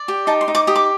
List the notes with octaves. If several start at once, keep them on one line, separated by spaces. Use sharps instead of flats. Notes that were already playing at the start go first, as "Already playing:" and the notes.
Already playing: D5
G4
D#4 A5
C6
D#4
D6
G4 D#6
D6